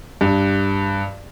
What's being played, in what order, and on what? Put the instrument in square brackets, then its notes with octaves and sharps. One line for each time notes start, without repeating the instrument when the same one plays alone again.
[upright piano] G2